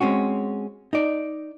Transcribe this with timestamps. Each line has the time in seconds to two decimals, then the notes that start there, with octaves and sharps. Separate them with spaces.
0.01 G#3 C4 C#4 F#4
0.93 D#4 D5